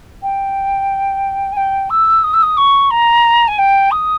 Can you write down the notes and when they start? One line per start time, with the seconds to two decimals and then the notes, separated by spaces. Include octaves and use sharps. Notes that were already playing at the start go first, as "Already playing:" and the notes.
0.22 G5
1.52 G#5
1.56 G5
1.90 E6
2.23 D#6
2.33 E6
2.42 D#6
2.57 C#6
2.90 A#5
3.47 G#5
3.58 G5
3.91 D#6